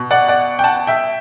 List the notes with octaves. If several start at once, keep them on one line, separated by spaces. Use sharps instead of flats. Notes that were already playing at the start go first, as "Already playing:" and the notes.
Already playing: B2
D5 F#5
D5 F#5
G5
F#5 A5
E5 G5